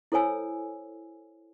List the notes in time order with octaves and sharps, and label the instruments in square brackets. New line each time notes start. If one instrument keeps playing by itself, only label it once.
[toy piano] E4 A4 C5 C#5 G#5 E6